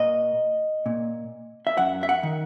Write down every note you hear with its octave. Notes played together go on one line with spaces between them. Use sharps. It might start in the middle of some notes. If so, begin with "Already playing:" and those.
Already playing: A#2 D#5
A#2
E5
F#2 F#5
E5
F#5
D#3